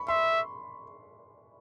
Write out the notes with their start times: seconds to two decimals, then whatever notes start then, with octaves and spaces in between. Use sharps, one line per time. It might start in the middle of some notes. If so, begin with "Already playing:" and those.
Already playing: B5 C#6
0.08 E5 C6